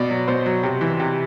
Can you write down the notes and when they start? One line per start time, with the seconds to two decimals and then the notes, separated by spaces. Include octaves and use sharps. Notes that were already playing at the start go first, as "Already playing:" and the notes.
Already playing: B2 D5
0.10 F#3
0.28 B2 C5
0.46 F#3
0.63 C3
0.81 E3
1.00 C3